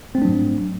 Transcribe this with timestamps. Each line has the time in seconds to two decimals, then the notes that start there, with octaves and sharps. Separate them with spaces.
0.15 C4
0.18 A3
0.22 D4
0.25 F#3
0.29 G#2